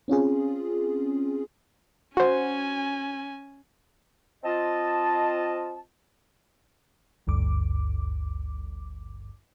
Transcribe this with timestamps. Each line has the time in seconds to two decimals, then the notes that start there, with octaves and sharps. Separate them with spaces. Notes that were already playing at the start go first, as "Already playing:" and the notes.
0.08 C4 C#4 F4 G#4
2.17 C#4 F#4 C5 G#5
4.43 C4 F4 D#5 A5
7.27 G#1 D2 G2 D6